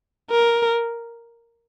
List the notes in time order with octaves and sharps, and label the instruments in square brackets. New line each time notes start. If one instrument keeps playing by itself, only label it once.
[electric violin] A#4